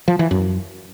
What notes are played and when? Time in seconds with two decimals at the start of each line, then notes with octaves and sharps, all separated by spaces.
0.08 F3
0.19 E3
0.31 F#2